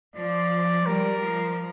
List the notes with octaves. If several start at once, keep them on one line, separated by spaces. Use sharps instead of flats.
F3 D5
G3 A#4
F3